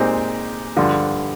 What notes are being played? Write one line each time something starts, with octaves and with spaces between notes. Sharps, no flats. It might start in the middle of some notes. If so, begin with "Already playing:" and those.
Already playing: A#2 G#3 C4 D#4 G4
G2 D3 F3